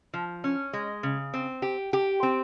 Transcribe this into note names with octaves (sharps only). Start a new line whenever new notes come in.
F3
C#4
G#3
C#3
C4
G4
G4
C4